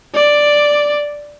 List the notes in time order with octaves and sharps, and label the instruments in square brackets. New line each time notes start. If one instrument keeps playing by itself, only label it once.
[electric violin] D5